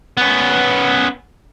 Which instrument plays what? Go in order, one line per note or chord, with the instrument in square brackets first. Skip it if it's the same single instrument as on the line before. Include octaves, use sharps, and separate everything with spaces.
[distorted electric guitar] B3 C#4